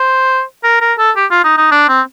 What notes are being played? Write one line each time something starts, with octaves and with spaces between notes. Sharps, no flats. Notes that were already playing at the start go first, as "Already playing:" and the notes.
Already playing: C5
A#4
A#4
A4
G4
F4
D#4
D#4
D4
C4